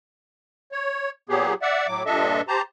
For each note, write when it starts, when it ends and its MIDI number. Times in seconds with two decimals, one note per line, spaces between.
0.72 1.10 73
1.29 1.54 46
1.29 1.54 54
1.29 1.54 59
1.29 1.54 67
1.29 1.54 68
1.62 1.87 74
1.62 1.87 76
1.62 1.87 78
1.87 2.03 45
1.87 2.03 54
1.87 2.03 86
2.06 2.41 43
2.06 2.41 46
2.06 2.41 62
2.06 2.41 69
2.06 2.41 75
2.06 2.41 76
2.48 2.62 67
2.48 2.62 72
2.48 2.62 81
2.48 2.62 82